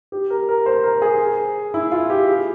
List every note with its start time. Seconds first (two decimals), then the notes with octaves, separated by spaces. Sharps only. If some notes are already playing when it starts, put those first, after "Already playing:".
0.12 G4
0.30 A#4
0.49 A#4
0.66 C5
0.84 A#4
1.02 G#4
1.74 E4
1.91 F4
2.10 G4
2.27 G#4